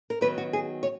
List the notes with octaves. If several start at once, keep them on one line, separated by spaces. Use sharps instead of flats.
A#4
D#3 F#3 B3 B4
F#4
G#4
C#5